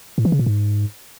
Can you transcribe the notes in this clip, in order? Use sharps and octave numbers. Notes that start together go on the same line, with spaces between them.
A2
E3
C#3
A#2
G#2